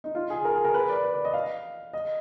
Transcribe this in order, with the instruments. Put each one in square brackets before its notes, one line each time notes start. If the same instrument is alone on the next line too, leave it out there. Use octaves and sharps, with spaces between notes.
[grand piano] D#4
F4
G#4
A#4
G#4
A#4
B4
D5
B4
D5
D#5
F5
D#5